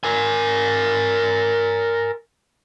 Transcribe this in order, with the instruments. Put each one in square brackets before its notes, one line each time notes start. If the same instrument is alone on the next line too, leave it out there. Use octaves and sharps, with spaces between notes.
[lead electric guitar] A#4 G#5